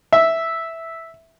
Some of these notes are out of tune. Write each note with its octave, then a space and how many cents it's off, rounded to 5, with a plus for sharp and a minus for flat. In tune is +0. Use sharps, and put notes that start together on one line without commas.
E5 -5